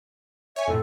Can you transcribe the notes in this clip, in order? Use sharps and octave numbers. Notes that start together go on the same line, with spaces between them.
C#5 E5 G#5
F2 A2 A4